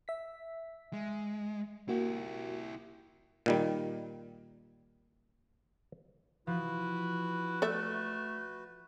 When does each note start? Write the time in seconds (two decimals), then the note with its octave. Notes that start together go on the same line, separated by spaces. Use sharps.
0.08 E5 B6
0.93 G#3
1.89 A#3 E4 F#4 G4
3.46 A#2 D#3 G3
6.47 F3 E4 F#4 B4
7.62 A3 A4 D5 E5